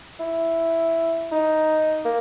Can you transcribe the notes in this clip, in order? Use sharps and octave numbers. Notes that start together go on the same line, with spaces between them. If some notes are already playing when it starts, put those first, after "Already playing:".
E4
D#4
A#3